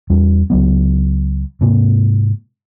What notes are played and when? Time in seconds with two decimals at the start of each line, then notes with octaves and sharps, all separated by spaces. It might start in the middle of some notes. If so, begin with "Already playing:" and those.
0.10 E2 G3 C#4
0.50 C#2 F#3 B3
1.61 G#2 C3 A#3